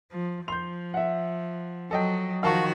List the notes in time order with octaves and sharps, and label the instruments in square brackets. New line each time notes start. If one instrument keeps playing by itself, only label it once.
[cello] F3
[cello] F3 [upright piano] C6 [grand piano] G6 F7
[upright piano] E5 F#5
[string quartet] F#3 [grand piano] A4 D#5 G5
[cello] D#3 F3 [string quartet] F#4 [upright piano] A#4 [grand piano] F5 A5 C#6